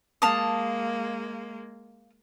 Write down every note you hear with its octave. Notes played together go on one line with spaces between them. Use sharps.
G#3 A#3 F5 A5 D#6